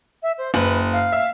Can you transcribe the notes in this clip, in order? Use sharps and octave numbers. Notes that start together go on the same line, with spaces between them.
E5
C5
F#1 B4 F#7
F5
E5